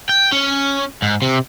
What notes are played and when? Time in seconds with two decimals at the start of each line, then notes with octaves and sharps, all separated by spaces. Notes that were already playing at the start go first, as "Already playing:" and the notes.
0.09 G5
0.32 C#4
1.02 G#2
1.22 C3